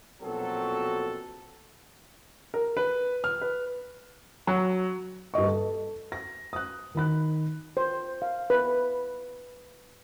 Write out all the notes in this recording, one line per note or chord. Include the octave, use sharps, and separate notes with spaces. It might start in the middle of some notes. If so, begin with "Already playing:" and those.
A#1 B2 F#3 C4 A4
A#4
B4
F6
B4
F#3
G2 A#3 D#5 C#6
A4
A#6
D#6 F#6
D#3 D#4 B5 F#6
C5
F5
B4